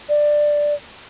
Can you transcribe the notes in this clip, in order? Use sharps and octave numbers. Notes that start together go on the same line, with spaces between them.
D5